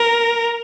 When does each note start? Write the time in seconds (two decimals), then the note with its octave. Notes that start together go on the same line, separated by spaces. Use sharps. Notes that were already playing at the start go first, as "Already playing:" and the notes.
Already playing: A#4